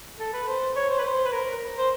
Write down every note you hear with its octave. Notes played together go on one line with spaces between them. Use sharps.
A4
B4
C5
C#5
C5
B4
C5
B4
A#4
C5